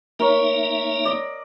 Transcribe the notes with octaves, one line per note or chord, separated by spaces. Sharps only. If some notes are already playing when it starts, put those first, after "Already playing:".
A#3 D#4 A#4 C#5 E5
D5 D#5